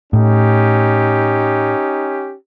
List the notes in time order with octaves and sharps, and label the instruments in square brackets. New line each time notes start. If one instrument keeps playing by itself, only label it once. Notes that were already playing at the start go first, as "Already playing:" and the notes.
[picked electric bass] A2 [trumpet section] C#4 D#4 G4